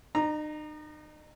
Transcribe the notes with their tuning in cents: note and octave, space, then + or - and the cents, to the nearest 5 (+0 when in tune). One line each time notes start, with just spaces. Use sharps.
D#4 -40 A#5 +0